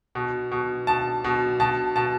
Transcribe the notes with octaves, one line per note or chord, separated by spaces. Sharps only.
B2
B2
B2 A5
B2
B2 A5
B2 A5